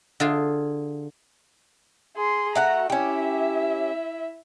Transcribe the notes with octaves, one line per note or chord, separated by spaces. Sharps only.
D3 F4 G#4
G#4 C6
A3 F#4 F#5 A#5
C#4 E4 G4 E5